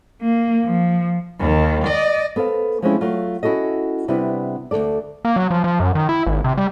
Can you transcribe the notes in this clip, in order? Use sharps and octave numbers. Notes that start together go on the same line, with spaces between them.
A#3
F3
D#2 D#3
D5 D#5
B3 A4 C5 F5
F3 G#3 A3 C4 C#4 E4
F#3 A3 F4
C#4 E4 F#4 A4 D#5
C3 G3 B3 D4 E4 B4
D2 C#3 A4 D5
A#3
F#3
F3
F3
F#2
D#3
E4
G#1
C3
G3